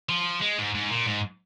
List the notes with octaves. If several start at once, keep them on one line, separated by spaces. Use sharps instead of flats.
F3
G#3
G#2
G#2
A#2
G#2